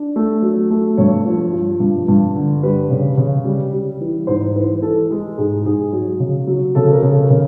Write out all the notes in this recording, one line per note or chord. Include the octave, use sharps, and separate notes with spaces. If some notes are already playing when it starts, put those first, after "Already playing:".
Already playing: D4
A3
F#3
A3
G2 C#5
F3
F3
G2
G2
D3
G3 B4
C#3
C#3
G3
G3
E3
G#2 C5
E3 B4
E3 A4
G#3
G#2 G#4
G#2 G#4
F#3
C#3
F#3
C#3 A4
A#4
C#3 A4
C#3 A#4